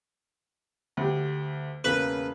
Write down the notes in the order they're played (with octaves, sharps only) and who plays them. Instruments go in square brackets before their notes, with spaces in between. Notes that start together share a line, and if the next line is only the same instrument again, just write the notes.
[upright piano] D2 G4
[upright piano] E1 C#3 A#3 [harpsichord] B4